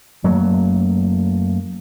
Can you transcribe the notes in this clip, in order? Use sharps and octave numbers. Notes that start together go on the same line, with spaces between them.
F#2 F#3 A3 A#3